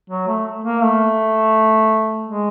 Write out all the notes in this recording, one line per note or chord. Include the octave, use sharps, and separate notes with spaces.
F#3
A3
A#3
A3
G#3